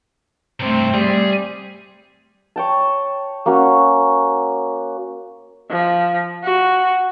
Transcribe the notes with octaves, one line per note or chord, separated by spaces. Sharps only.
G2 C3 A3 C4
G3 G#4
C#5 G5 A5
A#3 C#4 F#4
F3
F#4